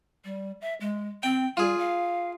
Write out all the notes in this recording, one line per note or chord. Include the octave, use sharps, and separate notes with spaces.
G3
E5
G#3
C4 G5
G3 F4 G#4
F5